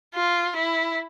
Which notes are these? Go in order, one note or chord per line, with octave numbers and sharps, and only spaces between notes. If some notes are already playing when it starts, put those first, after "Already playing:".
F4
E4